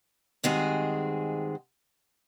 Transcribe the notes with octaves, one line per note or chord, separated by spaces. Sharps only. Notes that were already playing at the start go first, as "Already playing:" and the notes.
G2 D#3 G#3 C4 F#4 G#4